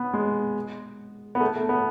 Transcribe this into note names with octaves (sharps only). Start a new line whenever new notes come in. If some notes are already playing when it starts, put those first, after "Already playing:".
Already playing: B3
G#3
B3
A3
A3
B3